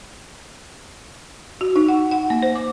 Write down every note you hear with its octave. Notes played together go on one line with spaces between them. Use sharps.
F#4
D#4
F#5
F#5
A#3
C5
D6